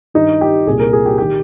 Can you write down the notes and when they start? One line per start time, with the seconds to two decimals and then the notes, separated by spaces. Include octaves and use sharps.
0.14 G2 D#3 D#4
0.41 G4
0.67 C2 A#2 G#4
0.80 A#4
0.93 G#4
1.06 G4
1.18 D#3 G4